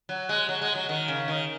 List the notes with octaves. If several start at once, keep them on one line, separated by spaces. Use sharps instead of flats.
F#3
G#3
F#3
G#3
F#3
D#3
C#3
D#3